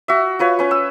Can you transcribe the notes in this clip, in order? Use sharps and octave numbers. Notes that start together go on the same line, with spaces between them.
F#4 E5
F4 B4 C#5
C#4 B4
E6